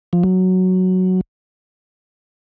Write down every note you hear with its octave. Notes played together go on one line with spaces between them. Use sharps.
F3
F#3